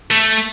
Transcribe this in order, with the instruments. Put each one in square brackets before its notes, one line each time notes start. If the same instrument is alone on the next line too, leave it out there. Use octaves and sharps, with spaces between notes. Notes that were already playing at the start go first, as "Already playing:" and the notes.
[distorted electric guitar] A3